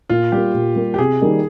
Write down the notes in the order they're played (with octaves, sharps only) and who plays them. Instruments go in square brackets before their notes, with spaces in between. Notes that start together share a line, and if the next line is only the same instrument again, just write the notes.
[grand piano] A#2 [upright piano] F4
[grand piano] G3 A#3 [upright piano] G4
[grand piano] A#2
G3 A#3
[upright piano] G4
[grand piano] C3 [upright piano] G#4
[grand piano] D#3 G3 A#3 D#4